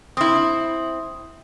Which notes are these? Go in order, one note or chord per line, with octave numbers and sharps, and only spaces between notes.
C4 E4 D#6